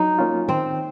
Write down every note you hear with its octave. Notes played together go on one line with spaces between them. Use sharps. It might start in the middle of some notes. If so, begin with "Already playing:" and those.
Already playing: F#3 D#4
A#3 C#4 F4
D#3 C4